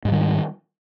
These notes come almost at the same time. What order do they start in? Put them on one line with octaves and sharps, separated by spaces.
G#2 G3 D#3